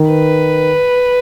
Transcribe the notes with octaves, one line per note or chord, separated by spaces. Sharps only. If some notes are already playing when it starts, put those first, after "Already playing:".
Already playing: D#3
B4